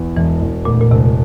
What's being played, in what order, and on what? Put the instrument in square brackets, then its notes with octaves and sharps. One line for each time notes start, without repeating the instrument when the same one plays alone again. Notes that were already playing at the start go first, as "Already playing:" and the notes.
Already playing: [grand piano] E2
[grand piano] E1 [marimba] E3
[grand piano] E1
[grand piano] D2 [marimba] A#2
[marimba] A#2
[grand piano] E1 [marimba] C3